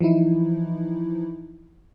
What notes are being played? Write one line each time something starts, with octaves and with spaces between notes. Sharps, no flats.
E3 F3 D#4 E4